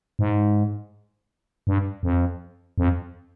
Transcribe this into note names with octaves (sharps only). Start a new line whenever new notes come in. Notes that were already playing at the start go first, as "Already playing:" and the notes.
G#2
G2
F2
F2